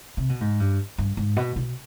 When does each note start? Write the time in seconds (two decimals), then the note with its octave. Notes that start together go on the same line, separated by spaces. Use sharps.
0.17 C3
0.29 B2
0.41 G#2
0.60 G2
0.98 G2
1.17 G#2
1.36 B2
1.56 B2